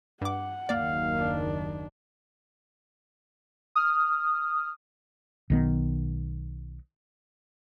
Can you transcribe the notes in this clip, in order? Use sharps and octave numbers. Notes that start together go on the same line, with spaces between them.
G2 F#5 D6
F#1 D#2 D#3 A#3 D5 F5
D4
D#6 F6
B1 D#3 B3